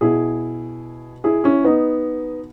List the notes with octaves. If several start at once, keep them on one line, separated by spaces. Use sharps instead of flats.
B2 E4 G#4
E4 G#4
C#4 E4
B3 D#4